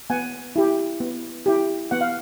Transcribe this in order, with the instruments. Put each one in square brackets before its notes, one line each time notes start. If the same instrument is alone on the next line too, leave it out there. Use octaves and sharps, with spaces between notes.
[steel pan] B3 F#5 G#5
E4 G4
B3
E4 G4
B3 F#5
F5